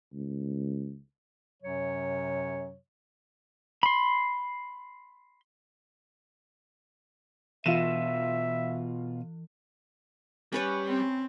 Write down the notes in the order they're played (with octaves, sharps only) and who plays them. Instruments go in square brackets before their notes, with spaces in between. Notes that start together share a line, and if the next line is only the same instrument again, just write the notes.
[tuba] C#2
[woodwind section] F#2 C3 F#3 C#5
[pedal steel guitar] B5 C6
[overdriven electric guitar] B2 [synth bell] E3 [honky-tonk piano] F4 E7 [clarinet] E5
[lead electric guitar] G3 [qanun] C#4 B4 C#5
[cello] C4